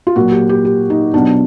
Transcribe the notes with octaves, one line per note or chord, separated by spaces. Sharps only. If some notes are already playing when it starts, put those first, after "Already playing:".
F4
A#2 F#3 A#3 F#4
G4
G4
G4
D#4
B2 F#3 B3 D4